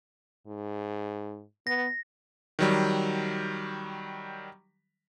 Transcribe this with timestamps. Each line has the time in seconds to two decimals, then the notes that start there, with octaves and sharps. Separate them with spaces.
0.47 G#2
1.67 B3 A#6
2.59 D#3 F#3 G3